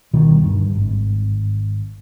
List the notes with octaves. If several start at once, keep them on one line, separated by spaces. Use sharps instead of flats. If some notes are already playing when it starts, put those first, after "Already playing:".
D2 B2 D#3 G3
G1 G2
G#1